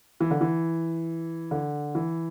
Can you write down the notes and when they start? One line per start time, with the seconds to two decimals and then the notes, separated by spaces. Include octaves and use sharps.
0.20 E3
0.31 D3
0.41 E3
1.51 D3
1.95 E3